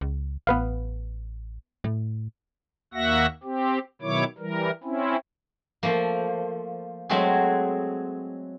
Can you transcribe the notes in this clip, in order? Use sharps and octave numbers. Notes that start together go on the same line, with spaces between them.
C#2
A1 B3 B4 F5
A2
D#2 A#3 F#4 E5 F#5 A#6
C4 G4
B2 D#3 F#3 E4 C#5 D6
E3 G3 A#4
C4 C#4 E4
F3 A3 A#3
F#3 G#3 A3 C4 F#4 G#4